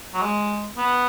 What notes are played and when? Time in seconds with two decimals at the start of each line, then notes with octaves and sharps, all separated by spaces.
0.14 F#3
0.22 G#3
0.77 B3